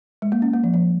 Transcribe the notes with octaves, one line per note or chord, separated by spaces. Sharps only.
G#3
A#3
C#4
A#3
F3
F3